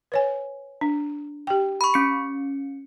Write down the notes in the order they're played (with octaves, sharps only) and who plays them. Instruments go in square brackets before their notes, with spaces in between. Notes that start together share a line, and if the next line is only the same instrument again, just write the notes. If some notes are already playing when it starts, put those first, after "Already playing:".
[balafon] B4 C#5 G#5
D4
G4 G5
[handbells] B5 C#6
C#4 C#7